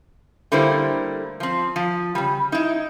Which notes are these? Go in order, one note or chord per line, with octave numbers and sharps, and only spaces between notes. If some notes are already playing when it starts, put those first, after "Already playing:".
D3 G3 A3 A#3 E4 C5
F3 C4
F3
C#3 G3
D#4 E4